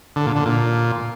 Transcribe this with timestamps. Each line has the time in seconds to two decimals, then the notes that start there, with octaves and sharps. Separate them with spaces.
0.16 D3
0.26 A#2
0.36 D3
0.46 A#2